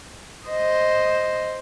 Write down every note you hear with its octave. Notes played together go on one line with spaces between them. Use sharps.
C5 D#5